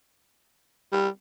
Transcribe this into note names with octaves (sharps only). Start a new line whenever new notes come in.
G3